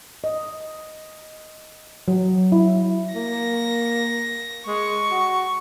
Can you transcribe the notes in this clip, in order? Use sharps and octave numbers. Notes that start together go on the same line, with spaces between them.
D#5
F#3
E4
A#3 A#6
G#3 C#6
F#4